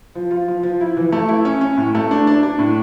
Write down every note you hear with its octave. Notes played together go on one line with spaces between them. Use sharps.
F3
F4
F3
F3
E4
E3
A3
E4
C#4
C#4
A2
A3
D4
D4
D4
A2